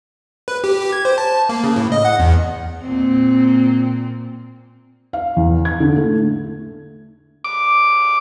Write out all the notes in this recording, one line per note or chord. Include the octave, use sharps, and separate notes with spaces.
B4
G4
G4
G#6
C5
A5
A#3
C#3
A2
D#5
F#5
E2
A#2 C4
F5
E2
G#6
D3
A3
D6